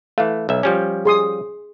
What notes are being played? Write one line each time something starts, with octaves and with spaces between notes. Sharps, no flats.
E3 A3 F5
B1 E5
F3 G3 C#4
G#4 C6 D#6